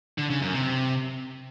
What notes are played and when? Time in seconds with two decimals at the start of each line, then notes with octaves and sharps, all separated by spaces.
0.18 D3
0.30 C#3
0.42 F#2
0.54 C3